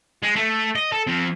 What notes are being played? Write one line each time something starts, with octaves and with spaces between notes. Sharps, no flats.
G#3
A3
D#5
A4
F3 C4